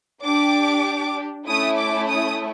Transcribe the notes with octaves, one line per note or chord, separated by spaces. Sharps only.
D4 G4 D6
A3 C#4 E4 D#6
D6
D#6